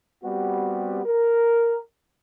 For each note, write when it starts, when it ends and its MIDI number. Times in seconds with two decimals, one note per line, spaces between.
0.24 1.01 55
0.24 1.01 59
0.24 1.01 60
0.24 1.01 66
0.24 1.01 67
1.06 1.80 70